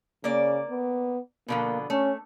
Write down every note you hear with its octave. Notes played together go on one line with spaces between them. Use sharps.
C#3 A#3 D5
B3
B2 D3 F3 A#3
A3 C#4